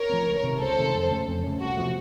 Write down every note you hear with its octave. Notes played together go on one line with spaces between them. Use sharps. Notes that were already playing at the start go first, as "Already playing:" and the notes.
Already playing: A#4 C#5
F3 A3 C4
C#2
C3 D#3 A3
C#2 A4 C5
C3 D#3 A3
F2
C#3 A3 C#4
F2
C#3 A3 C#4
C2 F#4
C3 F3 A3